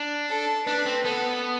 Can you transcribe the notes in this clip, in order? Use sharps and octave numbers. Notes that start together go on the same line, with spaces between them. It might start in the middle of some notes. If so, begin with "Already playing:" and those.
Already playing: D4
A4
D4 B4
C4
B3 A4